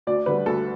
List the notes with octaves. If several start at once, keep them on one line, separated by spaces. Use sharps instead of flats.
D2 D5
D3 G3 B4
D2 A4